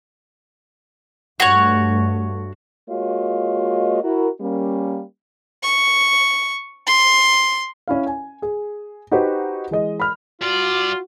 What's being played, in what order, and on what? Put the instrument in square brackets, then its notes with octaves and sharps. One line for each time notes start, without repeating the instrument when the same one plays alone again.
[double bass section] G2 A3 [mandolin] F#4 C#5
[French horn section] G#3 A#3 F4 F#4 C#5 D#5
E4 F#4 A#4
G3 A#3 C#4
[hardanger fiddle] C#6
C6
[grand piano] C#4 E4 F5
G#5
G#4
D#4 F#4 G4 B4 C5
E3 G#3 D#5
B5 F6
[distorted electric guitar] G2 D5 [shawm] F4 [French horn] F#4